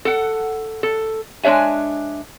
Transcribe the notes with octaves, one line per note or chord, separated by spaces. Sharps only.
A4 F#5
A4
G#3 D4 C#5 E5 G#5